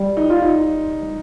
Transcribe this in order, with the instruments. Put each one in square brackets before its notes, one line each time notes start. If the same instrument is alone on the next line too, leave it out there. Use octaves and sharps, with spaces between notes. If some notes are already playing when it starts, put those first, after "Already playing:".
Already playing: [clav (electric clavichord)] G3
[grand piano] D#4
F4
D#4